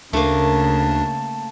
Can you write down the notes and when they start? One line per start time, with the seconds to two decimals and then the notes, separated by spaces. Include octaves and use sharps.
0.13 D2 C#3 A3 A#3 D4 A5